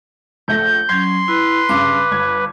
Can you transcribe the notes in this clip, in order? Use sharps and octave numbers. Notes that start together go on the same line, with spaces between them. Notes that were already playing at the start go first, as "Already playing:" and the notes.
A#1 A3 G6 A#6
F#3 C#4 C6 G#6
E4 B4
G2 C#3 D6
G1 G#6